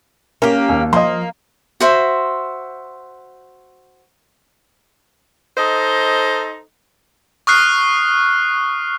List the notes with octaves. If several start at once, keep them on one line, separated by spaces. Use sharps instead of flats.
A#3 C#4 G4 A#4
D#2
F3 A#3 D#5 C6
F#4 C5 E5
D#4 A4 C5 D#5
C#6 D#6 F6 F#6 C7